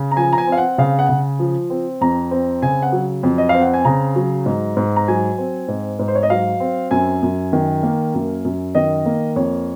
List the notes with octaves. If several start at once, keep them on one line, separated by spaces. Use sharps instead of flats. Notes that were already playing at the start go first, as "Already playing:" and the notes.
Already playing: C#3
A#5
F3 G#5
A#5
G#5
C4
F5
F#5
C#3 F5
F#5
C#3
F3
C4
F2 A#5
C4
C#3 G#5
F#5
F#3
F2
D#5
C4 F5
F#5
G#5
C#3 A#5
F#3
G#2
G#2
A#5
F#3 G#5
C4
G#2
G#2
C5
C#5
D#5
F#3 F5
C4
F#2 G#5
F#2
D#3
A#3
F#2
F#2
D#3 D#5
A#3
F2 C#5